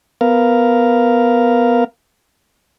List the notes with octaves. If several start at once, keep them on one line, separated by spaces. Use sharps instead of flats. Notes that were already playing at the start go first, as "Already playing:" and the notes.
B3 A#4 F5